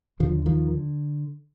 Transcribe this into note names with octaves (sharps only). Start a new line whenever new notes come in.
D#2 D3 D#3 F3
D#3 F3
D3